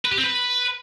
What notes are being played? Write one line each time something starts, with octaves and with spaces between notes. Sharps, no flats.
B4
G4
C4
B4